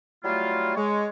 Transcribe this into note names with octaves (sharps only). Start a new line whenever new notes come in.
F#3 G3 A3 E4 F4
G#3 C#5